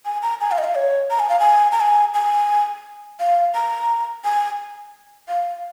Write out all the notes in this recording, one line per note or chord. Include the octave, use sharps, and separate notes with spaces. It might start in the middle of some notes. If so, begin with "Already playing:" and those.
G#5
A#5
G#5
F5
D#5
F5
C#5
A#5
G#5
F5
G#5
A#5
G#5
G#5
F5
A#5
G#5
F5